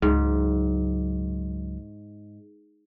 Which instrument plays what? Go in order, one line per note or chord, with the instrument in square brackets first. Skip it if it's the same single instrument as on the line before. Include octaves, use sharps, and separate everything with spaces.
[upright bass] C#2 F#3 [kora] G#2